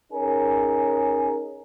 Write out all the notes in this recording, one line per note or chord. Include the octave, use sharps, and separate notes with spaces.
C#4 D#4 G#4 A#4